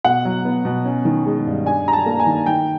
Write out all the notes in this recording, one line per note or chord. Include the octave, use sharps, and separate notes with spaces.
B2 F#5
F#3
B3
B2
C#4
D#3
G#3
G2
D4 G#5
G3 A#5
A5
A#3
G#5
D#3
D#3 G5